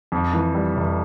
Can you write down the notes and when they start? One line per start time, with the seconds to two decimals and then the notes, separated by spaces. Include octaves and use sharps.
0.12 F2
0.33 E3
0.54 G3
0.76 F1